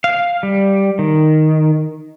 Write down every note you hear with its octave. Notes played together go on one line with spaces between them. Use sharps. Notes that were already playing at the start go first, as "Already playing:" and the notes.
F5
G3
D#3